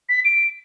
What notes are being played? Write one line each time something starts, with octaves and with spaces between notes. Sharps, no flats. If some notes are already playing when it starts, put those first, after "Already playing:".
B6
D7